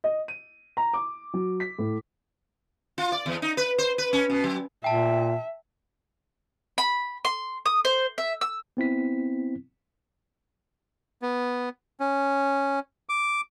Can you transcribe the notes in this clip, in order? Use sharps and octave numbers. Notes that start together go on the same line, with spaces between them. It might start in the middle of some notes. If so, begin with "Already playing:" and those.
D#5
D#7
A#5
D6
F#3
B6
A2
F4
D5
E2
D#4
B4
C5
B4
C#4
B2
F#3
A#2 E5 G5 A5
B5
C6
D#6
C5
E5
E6
B3 C4 E4 B6
B3
C#4
D6